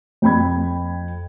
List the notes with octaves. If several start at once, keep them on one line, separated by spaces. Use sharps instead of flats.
F2 G5 B5 G#6